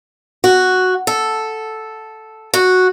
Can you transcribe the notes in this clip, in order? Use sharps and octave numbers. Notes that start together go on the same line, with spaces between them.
F#4
A4
F#4